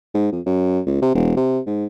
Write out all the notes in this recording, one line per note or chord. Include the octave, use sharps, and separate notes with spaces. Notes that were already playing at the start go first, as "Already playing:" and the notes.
G#2
F2
F#2
C#2
C3
E1
C3
G#2